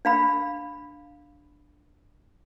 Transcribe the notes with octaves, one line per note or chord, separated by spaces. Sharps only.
D4 F5 B5